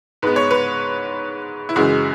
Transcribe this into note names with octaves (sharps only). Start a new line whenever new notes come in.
G#2 G#3 B3 B4
C#5
B4
E4
F#2 C#3 E3 G#3 F#4